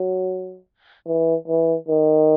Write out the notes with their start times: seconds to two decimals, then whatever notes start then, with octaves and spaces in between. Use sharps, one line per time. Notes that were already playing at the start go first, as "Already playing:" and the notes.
Already playing: F#3
1.07 E3
1.48 E3
1.88 D#3